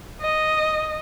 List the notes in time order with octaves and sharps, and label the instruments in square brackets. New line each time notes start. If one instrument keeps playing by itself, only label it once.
[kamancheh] D#5